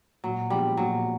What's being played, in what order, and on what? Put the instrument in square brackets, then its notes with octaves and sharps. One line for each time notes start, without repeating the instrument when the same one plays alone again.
[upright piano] A#2 [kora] F#3
[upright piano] F3 G#3 B3 D4 [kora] G3
[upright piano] A#2 [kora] F#3